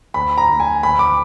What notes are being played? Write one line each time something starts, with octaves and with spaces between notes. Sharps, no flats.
D2 B5
A#5
D2
G#5
D2 B5
D6